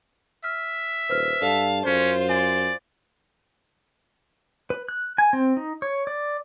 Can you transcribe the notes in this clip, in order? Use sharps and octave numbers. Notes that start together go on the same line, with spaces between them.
E5 F6
D#1 B4 C5 F6
G2 A4 D5 F5 A5
F#2 C#4 F4 C5
D5 G#5
B4
F#6
G#5
C4
D#4
C#5
D5